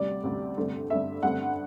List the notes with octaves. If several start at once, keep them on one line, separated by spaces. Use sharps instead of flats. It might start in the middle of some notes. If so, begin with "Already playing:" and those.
Already playing: D2 C3 G3 D5
D2 C3 G3
G2 D3 A3 C4
G2 D3 A3 C4 E5
G2 D3 A3 C4 F#5